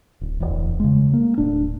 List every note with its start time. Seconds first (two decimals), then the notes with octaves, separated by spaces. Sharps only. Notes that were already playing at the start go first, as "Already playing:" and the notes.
0.21 D1
0.40 D1 E2
0.80 C#3 G#3
1.14 A#3
1.38 D#1 A2 D4